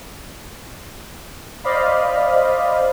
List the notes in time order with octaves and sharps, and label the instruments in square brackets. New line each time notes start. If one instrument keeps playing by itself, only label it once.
[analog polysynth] C5 D5 D#5 F5 B5